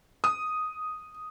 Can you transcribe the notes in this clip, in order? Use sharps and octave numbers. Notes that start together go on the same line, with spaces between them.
D#6